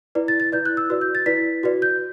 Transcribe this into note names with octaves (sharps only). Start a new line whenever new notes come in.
E4 B4 D5
A6
A6
E4 B4 D5 G6
F#6
E6
F#4 B4 D5 E6
G6
A6
E4 B4 D5 B6
F#4 B4 D5
G6